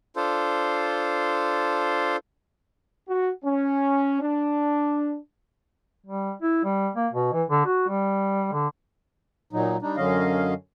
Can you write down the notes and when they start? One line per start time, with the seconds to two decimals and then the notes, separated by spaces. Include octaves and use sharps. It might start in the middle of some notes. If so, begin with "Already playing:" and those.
0.16 D4 F4 A4 C5
3.08 F#4
3.45 C#4
4.21 D4
6.06 G3
6.42 E4
6.64 G3
6.96 A#3
7.13 B2
7.33 E3
7.50 D3
7.66 F#4
7.88 G3
8.53 D3
9.53 A#2 F#3 D#4
9.82 G3 D4 D#4
9.97 F#2 D3 F#3 C#4 D#5 F5